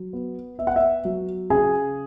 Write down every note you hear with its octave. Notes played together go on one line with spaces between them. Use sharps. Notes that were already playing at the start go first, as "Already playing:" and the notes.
Already playing: F#3
B3
B3 E5
F#5
E5
F#3
C#3 G#4 G#5